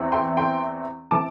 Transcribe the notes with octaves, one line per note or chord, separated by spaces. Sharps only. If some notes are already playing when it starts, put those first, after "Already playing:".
Already playing: E2 E3 C4
G5 C6
G5 C6
E3 C4 A5 D6